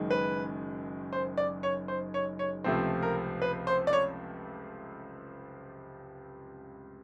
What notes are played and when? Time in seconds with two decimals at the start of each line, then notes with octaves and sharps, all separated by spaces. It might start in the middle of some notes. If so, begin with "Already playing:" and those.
Already playing: F#1 F#2 D#3 G#3
0.11 B4
1.13 C5
1.37 D5
1.63 C#5
1.88 C5
2.14 C#5
2.39 C#5
2.64 C#2 C3 F3 A3 C4
3.03 A#4
3.42 B4
3.67 C5
3.87 D5
3.93 C#5